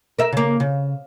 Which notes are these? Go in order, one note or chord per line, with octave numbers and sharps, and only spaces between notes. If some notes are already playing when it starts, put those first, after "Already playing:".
A#4 E5
C#3 A#3
C#3